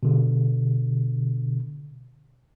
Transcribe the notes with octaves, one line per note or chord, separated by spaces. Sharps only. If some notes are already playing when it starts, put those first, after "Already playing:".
B2 D3